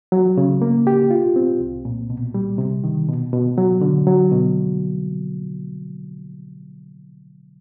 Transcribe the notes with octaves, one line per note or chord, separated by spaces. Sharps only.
F#3
C#3
A#3
G4
F4
C4
C2
A#2
B2
G3
C3
D#3
B2
B2
F#3
D3
F#3
B2